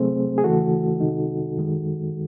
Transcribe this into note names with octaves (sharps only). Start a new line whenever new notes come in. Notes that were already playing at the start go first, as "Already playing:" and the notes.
Already playing: C3 F#3 A3 C4 G#4 C5
G#4
D#2 C#3 E3 A3 F#4 A4
C2 C3 D#3 G#3 D#4
F#2 D#3 G#3